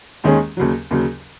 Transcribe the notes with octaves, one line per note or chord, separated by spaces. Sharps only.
D#2 D#3 G#3 C#4 G#4
D#2 C#3 F#3
D#2 C#3 F#3